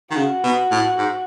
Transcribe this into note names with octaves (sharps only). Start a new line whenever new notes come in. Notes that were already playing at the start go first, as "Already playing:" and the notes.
D#3
C#3 F#4
B2
A2
G#2